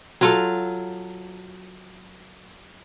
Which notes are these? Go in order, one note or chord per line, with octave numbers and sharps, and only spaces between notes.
F#3 F4 A4